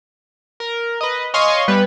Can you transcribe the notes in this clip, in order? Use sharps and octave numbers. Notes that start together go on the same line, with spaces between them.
A#4
B4 D#5
C#5 D#5 F5 G#5 C6 C#6
G3 B3 B4